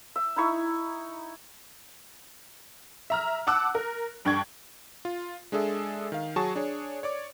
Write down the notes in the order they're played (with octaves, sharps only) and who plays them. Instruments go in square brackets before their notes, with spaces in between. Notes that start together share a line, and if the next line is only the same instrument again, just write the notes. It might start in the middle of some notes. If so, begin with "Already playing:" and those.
[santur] E5
D#4 E4 C#6
[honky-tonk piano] E5 A#5 F6
F#5 A5 D6 E6 F#6
A#4
G2 D4 G5 C#6 G#6
[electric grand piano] F4
G#3 D4 G#4 A4 E5
D#3 F5
F#3 F#4 G#4 A5 C#6
D4 G#4 C#5
C#5 D5 D6